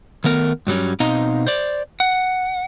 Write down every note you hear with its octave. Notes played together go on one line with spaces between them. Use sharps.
D#3 A3 B3 A#4
G2 F#3 G3 C#4
B2 C4 D#4 D#5 F5 A#5
C5 D5
F#5